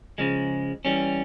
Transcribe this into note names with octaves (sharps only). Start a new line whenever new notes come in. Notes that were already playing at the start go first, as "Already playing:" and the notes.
C#3 F3 G#3
E3 G3 C#4